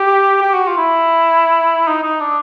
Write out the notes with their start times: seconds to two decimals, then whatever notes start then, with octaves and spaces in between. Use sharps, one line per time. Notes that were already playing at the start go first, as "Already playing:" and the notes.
Already playing: G4
0.42 G4
0.54 F#4
0.67 F4
0.78 E4
1.87 D#4
2.04 D#4
2.21 D4